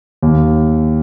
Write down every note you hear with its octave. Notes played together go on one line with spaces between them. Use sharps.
D#2